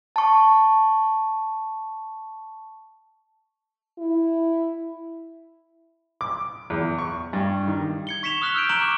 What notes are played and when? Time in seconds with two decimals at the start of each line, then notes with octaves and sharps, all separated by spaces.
0.16 A5 C#6
3.98 E4
6.21 D6
6.70 E2
6.98 C#6
7.33 G2
7.68 D#3
8.07 G#6 C#7 G7
8.23 C#6 B6 C#7 E7 F7 G7
8.42 D#6 F6 F#6 B6 F7 F#7
8.55 E6 F6 G6 D7
8.69 A#5 C#6 F6 D7 E7 F#7
8.81 D6